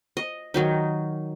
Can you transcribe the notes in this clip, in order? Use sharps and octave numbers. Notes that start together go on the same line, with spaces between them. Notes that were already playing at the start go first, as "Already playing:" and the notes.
D#5
D#3 F#3 D#4